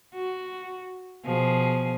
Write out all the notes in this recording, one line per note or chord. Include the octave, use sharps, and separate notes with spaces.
F#4
B2 F3 G#4